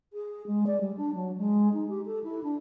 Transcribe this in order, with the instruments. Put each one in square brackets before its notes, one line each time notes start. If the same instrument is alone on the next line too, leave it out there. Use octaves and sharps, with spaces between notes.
[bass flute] G#4
G#3
D5
G3
D4
F#3
G#3
D#4
G4
A4
E4
D4